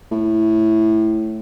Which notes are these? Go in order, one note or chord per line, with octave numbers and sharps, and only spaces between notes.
A2